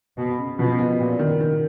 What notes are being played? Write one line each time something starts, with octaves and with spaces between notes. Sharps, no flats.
B2 B3
C#3
B2 F3
B3
A#2 B3
D#3
D#3